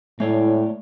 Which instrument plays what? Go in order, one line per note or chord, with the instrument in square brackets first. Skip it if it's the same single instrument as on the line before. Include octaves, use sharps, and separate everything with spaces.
[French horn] A2 [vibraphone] G#3 E4 [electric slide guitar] A3 C#5 D5